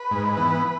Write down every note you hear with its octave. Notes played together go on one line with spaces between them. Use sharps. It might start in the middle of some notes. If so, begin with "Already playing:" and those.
Already playing: B4
G#2
E3 B3